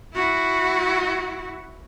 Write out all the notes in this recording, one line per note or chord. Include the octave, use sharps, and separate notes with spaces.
E4 F#4